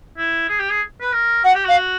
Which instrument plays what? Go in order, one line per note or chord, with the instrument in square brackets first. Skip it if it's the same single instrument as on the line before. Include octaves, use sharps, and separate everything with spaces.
[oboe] E4
G#4
G4
G#4
B4
A#4
[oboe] F#4 [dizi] F#5
[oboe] G4
[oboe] F#4 [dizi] F5